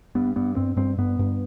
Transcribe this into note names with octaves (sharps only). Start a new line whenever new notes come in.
G2 B3
G2 B3
G2 C4
G2 C4
G2 B3
G2